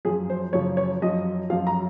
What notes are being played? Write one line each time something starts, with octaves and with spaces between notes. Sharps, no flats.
F#2 F3 G#4
C5
F#2 C#3 F3 C#5
C#5
F#2 F3 D#5
F#2 F3 F5
A#5